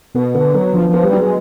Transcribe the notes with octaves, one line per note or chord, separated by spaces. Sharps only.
B2 B3
D3 B3
F#3 B3
D3 F3
F3 B3
G3
F#3
G#3